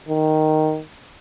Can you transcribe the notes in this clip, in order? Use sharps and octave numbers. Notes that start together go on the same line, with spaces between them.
D#3